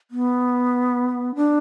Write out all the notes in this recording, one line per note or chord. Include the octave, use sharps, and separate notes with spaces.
B3
D4